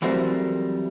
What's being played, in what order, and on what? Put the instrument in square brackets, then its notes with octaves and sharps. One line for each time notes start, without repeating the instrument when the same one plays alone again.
[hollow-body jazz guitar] E3 F#3 G3 A3 C4 A#4